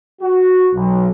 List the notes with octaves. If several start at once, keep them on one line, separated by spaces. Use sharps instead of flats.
F#4
B1